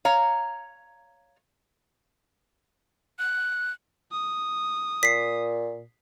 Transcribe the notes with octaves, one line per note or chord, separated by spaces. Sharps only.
C#5 F5 A#5
F#6
D#6
A#2 B6 C7